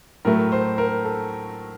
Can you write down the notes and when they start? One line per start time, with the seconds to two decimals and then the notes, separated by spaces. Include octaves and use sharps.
0.25 A2 F#3 A3 A#4
0.52 C5
0.78 A#4
1.05 A4